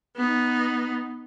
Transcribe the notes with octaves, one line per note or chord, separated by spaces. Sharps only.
B3 D#4